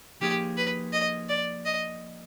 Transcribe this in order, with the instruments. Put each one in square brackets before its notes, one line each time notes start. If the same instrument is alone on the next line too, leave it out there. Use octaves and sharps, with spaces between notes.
[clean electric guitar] F3 A#3 D#4 G#4 C#5 [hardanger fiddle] G4
[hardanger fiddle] B4
D#5
D5
D#5